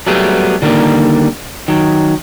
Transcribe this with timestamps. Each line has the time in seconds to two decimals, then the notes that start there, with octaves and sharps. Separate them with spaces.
0.07 F#3 G3 A3 B3 G4 G#4
0.62 D3 D#3 G3 A3 A#3
1.68 D#3 F#3